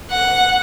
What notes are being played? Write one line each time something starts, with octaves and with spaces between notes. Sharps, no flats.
F#5